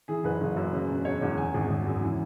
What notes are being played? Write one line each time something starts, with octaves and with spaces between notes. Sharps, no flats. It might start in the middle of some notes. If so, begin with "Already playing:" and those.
E3 G#4
F#1 B4
F#1
F#2
C#3
E1
E1 C#5
E2
C#3 G#5
G#1
G#1
F#2
E3